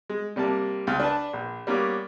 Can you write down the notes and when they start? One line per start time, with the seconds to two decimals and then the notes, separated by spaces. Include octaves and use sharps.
0.09 G#3
0.36 C3 G3 A#3 A5
0.87 C#2 F5 F6
1.00 D4 B4 A5
1.33 A#1
1.67 G3 A#3 B3 C#4 D6